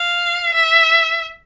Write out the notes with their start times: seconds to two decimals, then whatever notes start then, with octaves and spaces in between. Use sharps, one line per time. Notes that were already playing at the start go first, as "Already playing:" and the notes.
Already playing: F5
0.54 E5